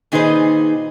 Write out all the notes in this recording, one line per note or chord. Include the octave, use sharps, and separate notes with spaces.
A#2 D#3 D#4 G#4 B4 C5